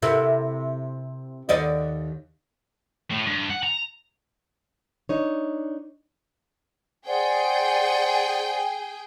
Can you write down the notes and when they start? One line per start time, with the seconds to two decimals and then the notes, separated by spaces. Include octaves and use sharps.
0.02 C3 E4 A#4
1.49 D#2 D5 D#5
3.11 A2
3.27 G2
3.50 F#5
3.63 A#5
5.09 D4 D#4 C#5
7.06 G#4 C5 D5 F#5 G5